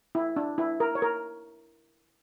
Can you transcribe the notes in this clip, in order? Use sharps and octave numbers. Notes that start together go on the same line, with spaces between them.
E4
D4
E4
A#4
C#5
A#4